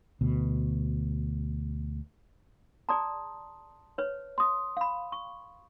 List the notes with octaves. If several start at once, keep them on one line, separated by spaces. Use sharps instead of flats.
D2 B2
G#4 D5 A5 A#5 C6 D#6
B4 C#5
C6 D#6
F5 B5
C#6